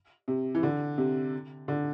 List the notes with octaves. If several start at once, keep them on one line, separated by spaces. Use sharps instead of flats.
C3
E3
D3
C3
D3